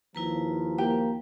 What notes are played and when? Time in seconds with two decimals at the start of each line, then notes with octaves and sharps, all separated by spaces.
0.15 D#2 F3 E4 B4 A#5
0.78 A#3 G4